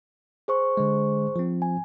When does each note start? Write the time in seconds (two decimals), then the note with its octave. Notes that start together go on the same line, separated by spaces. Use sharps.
0.48 G#4 C5 C#6
0.77 D3 G#3
1.36 F3 C4
1.62 G#5